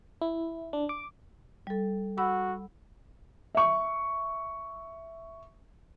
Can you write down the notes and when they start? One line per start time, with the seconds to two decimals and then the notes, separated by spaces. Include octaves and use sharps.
0.22 E4
0.73 D4
0.89 D6
1.67 G3 A4
2.18 F#4 F#5 B5 E6
3.55 E5 C#6